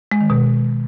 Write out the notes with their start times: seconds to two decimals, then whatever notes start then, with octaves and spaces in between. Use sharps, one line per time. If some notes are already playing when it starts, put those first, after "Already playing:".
0.11 G#3
0.21 D#3
0.30 B2